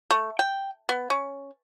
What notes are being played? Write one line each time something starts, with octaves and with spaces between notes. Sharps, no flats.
A3
G5
B3
C#4